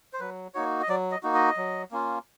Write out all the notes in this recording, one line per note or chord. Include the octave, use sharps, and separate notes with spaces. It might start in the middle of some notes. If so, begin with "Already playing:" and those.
C5
F#3 B4
A#3 D#4 F#4 C#5
D#5
F#3 D5
D#5
A#3 D#4 F#4
D#5
F#3
A#3 C#4 F4